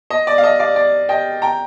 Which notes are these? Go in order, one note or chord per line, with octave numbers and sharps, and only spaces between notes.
D#5
D5
F5
D#5
D5 F5
D5
D#5 G5
G5 A#5